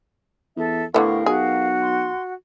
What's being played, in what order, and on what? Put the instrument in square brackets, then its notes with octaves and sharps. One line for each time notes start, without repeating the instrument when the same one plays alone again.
[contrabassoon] E2 [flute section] A4 E5
[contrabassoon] A2 [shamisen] D3 D#3 B3 [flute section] G4 A#4 F5 [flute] C#6
[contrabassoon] B1 [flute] F#4 [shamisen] G#4
[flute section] C6